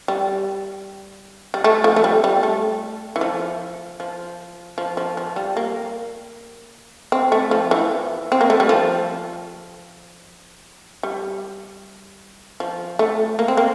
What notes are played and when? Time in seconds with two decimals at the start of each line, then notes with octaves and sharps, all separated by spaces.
0.08 G3
1.54 G3
1.64 A3
1.84 F3
1.96 A3
2.04 G3
2.24 G3
2.43 A3
3.16 E3
3.21 F3
4.00 F3
4.78 F3
4.97 F3
5.17 F3
5.36 G3
5.57 A#3
7.12 C4
7.32 A3
7.51 F3
7.71 E3
8.32 C4
8.41 A#3
8.50 A3
8.60 G3
8.69 F3
11.03 G3
12.60 F3
12.99 A3
13.39 A#3
13.48 C4
13.57 A#3